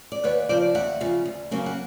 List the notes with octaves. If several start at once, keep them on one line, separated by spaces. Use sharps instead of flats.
D5
D#2 B4 C#5
C#3 F3 C5 D5
D#2 E5 F#5
C#3 F3
D2
C#3 F#3 A#3 C#4
F#5